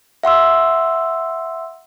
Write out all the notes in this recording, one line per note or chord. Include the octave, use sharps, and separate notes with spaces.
E5 F#5 C6 E6